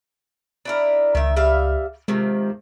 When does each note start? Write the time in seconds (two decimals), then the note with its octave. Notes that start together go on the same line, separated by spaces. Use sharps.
0.65 D4 E4 A#4
1.15 C#2 D#3 E5
1.36 G3 E5 F5
2.08 C3 D#3 F3 G#3